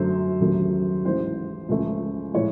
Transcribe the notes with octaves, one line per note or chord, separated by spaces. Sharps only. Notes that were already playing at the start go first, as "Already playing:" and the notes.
Already playing: F#2 D3 F#3 A3 C5
D#2 C#3 F#3 A3
A1 G#2 E3 G#3 C5
C#2 C#3 F3 A3
A2 F3 G#3 C#5